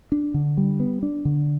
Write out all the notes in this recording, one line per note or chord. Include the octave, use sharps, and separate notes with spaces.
D4
D3
G3
B3
D4
D3